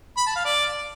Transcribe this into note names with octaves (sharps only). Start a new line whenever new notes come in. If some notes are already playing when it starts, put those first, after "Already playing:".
B5
A5
F5
D5